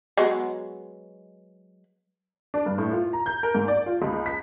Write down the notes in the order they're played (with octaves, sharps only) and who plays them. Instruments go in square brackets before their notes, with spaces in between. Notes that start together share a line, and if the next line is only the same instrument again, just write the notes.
[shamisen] F#3 G#3 B3
[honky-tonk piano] D4
G2
A2
F4
A#5
G6
A#4
G#2
D5
F4
C#2
B6